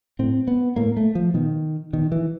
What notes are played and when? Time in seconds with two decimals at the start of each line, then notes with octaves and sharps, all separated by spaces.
0.19 A2 C4
0.48 B3
0.76 A2 A#3
0.97 A3
1.15 F3
1.34 B2 D#3
1.93 B2 D#3
2.12 E3